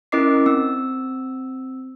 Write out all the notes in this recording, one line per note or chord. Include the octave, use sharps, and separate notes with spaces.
C#4 E4 A#4 D#5 D6 C7
C4 E6